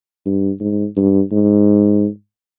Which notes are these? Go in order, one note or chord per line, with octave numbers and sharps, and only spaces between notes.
G2
G#2
G2
G#2